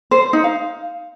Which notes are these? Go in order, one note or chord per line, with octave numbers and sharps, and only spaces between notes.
C5
C5
D#4
F5